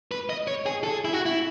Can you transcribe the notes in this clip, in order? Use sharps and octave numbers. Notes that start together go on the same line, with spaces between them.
B4
D#5
C#5
G#4
A4
G#4
E4
F#4
E4